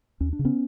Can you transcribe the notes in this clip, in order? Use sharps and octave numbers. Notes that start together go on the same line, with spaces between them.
D#2 C#4
D4
C#3
B3 C#4